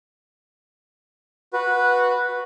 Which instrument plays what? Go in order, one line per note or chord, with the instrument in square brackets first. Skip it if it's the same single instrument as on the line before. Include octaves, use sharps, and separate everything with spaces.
[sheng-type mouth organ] F#4 B4